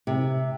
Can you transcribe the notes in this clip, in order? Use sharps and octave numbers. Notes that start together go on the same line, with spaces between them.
C3